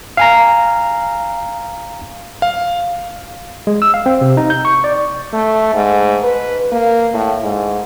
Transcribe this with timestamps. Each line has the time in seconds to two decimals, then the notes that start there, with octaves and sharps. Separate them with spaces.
0.17 F5 G#5 A#5
2.42 F5
3.67 G#3
3.82 E6
3.94 F5
4.06 C4
4.21 C3
4.37 D#4
4.50 G6
4.65 C#6
4.84 D5
5.33 A3
5.74 G#2
6.23 B4
6.72 A#3
7.14 A2
7.43 G#2